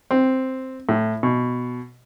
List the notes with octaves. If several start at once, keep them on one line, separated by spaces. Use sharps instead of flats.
C4
A2
B2